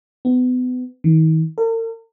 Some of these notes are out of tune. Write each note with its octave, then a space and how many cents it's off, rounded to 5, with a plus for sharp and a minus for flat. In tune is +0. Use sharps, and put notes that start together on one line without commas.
B3 +30
D#3 +40
A#4 -45